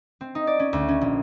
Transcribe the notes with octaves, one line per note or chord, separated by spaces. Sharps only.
C4
D#4
D5
C#4
D2
C#4
A#1